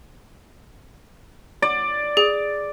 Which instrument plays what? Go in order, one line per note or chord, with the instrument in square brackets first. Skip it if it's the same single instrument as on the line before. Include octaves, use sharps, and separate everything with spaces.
[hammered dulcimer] D5
[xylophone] G#4